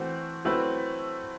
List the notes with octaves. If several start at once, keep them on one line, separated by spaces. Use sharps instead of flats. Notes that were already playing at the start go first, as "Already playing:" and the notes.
Already playing: E3 A3 C4 F#4 C5
F#3 A3 C4 E4 B4